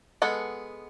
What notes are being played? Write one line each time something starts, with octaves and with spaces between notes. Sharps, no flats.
G#3 B3 A4 F#5